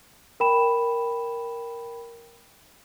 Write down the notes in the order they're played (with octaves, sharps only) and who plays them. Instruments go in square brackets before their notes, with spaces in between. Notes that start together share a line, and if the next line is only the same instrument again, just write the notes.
[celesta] A#4 G5 B5 E7